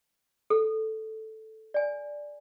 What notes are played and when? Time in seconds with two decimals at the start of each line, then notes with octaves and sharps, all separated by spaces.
0.50 A4
1.74 D5 G#5